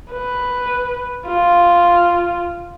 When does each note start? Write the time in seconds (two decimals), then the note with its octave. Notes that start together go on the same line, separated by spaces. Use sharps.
0.12 B4
1.27 F4